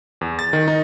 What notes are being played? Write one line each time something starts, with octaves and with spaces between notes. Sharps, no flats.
E2
A6
D#3
D#4